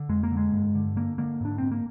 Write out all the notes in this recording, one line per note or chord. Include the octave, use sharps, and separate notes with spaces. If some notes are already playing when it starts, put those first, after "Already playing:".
Already playing: D3
F2 G#3
A#3
D3
G#3
G2
D3
D3 A#3
D3 A#3
G#2 D4
G#2 C4
A#3